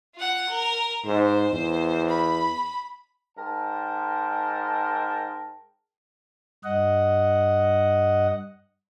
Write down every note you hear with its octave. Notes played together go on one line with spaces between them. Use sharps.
F4 F#5
A#4
G#2 C5
E2
B5
G#2 A#4 G5 A5
G2 D#5 F#5